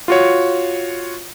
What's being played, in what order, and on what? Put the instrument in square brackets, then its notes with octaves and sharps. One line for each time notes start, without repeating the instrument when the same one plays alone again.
[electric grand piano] F4 F#4 C#5